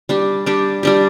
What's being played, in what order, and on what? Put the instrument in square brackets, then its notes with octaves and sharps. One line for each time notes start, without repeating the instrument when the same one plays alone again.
[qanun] G3 D4 G4
G3 D4 G4
G3 D4 G4